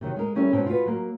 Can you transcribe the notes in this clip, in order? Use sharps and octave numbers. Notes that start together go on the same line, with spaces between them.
C3 D#3 F#3
G#3 A#4
E3 G3 C#4 E4 A4 A#4
G#2 B2 C4 C#4 C#5 A5
F4 F#4 G#4 B4
F#3 A#3